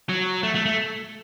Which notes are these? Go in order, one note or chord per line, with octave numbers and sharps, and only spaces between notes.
F#3
A3
A3
A3